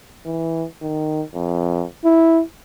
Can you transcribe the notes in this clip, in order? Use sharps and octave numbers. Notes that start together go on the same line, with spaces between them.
E3
D#3
F2
E4